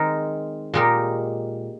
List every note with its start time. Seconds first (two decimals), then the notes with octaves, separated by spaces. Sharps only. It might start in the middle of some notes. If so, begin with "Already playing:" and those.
Already playing: D#3 G#3 C4 D#4 A#4
0.74 A#2 G#3 D#4 G4 A#4